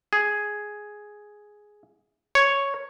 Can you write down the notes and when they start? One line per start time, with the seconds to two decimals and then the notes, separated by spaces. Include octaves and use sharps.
0.13 G#4
2.35 C#5